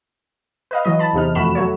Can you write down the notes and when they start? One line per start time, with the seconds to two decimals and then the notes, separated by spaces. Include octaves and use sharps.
0.71 B4 D#5 F5
0.85 E3 F#3 D#5
0.99 A5 B5
1.13 E2 C3 D#4 F6
1.35 F2 A3 F#4 B5 E7
1.55 F#3 A3 C#5